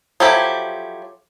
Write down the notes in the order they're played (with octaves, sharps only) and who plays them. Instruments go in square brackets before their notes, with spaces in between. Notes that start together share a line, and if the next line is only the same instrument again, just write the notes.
[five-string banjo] F3 F#3 E4 G4 A4